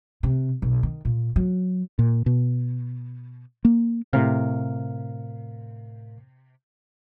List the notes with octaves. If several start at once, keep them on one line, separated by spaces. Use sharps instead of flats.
C3
B1
D#3
A#2
F#3
A#2
B2
A#3
A2 C3 A#4 F5